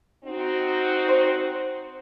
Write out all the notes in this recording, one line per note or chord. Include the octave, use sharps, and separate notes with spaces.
C4 D#4 F#4
C5 C6